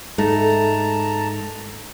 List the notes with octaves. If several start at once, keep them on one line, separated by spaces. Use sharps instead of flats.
G#2 A3 A5 A#5